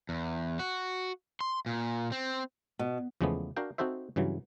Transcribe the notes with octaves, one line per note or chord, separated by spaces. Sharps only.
E2
F#4
C6
A#2
C4
B2
E2 C#3 F3 G#3 A3 B3
D4 F#4 A#4 F5 G5
C4 D#4 F#4 A4 C5 E5
G2 C#3 E3 F#3